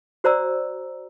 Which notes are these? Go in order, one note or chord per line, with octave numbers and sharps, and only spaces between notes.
F#4 C5 D5 A#5 E6